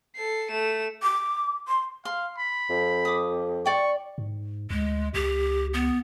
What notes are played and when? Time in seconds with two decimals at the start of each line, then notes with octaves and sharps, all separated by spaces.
0.16 A4 C7
0.51 A3 E7
1.03 D6
1.68 C6
2.05 F5 C6
2.38 B5
2.69 F2
3.05 D6 D#6
3.66 D5 G5 C#6
4.18 G#2
4.70 D2 G#3
5.14 C#2 G4
5.74 B3